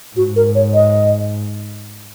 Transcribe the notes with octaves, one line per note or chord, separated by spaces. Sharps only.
G#2 F#4
A#4
C#5
D#5